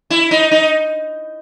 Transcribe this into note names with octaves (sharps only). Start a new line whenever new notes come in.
E4
D#4
D#4